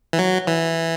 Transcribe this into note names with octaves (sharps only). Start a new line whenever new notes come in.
E3
F#3
E3